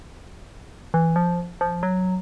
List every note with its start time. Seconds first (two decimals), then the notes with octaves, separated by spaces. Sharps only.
0.94 E3
1.16 F3
1.61 F3
1.83 F#3